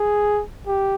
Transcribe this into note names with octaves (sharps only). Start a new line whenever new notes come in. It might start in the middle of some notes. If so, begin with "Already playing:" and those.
Already playing: G#4
G4